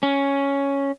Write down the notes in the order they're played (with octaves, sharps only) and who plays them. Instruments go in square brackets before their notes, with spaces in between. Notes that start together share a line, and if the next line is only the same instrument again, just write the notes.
[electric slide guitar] C#4